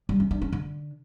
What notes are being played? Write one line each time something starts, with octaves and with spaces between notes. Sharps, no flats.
G3
C#4
D4
C#4
D3